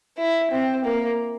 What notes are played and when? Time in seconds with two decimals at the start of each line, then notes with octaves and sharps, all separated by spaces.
0.18 E4
0.51 C4
0.85 A#3